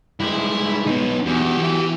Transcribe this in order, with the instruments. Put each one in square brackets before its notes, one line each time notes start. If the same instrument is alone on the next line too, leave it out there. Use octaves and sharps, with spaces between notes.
[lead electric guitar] G2 G#3 [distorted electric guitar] E4
[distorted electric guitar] B3 D#4
[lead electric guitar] E2 [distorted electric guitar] F#4 G4
[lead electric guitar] E3